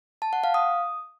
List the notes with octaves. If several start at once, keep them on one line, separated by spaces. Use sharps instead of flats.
A5
F#5
F5
D#6